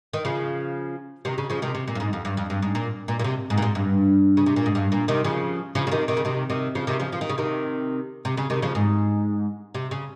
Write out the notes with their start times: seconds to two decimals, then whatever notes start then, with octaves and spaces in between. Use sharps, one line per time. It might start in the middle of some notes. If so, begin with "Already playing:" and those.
0.13 D#3
0.25 C#3 F3
1.25 C3 D#3
1.38 C#3
1.50 C#3 F3
1.62 C3 D#3
1.74 C3
1.88 A#2
1.95 G2
2.00 G#2
2.13 F2
2.25 G2
2.37 F2
2.50 G2
2.62 G#2
2.75 A#2
3.08 A#2
3.19 A#2
3.24 C3
3.50 G#2
3.58 A#2
3.62 G#2
3.75 G2
4.37 C#3
4.46 C3
4.56 A#2
4.66 G#2
4.75 G2
4.92 A#2
5.08 C3 D#3
5.24 C#3 F3
5.75 C#3 F3
5.87 C#3
5.91 C3 D#3
6.08 C3 D#3
6.17 C#3
6.25 C3 D#3
6.50 C3 D#3
6.75 C#3 F3
6.87 C3 D#3
7.00 C#3 F3
7.12 F3
7.21 D#3
7.29 C#3
7.38 C3 D#3
8.25 C3
8.37 C#3
8.50 C3 D#3
8.62 C#3 F3
8.75 G#2
9.74 C3
9.91 C#3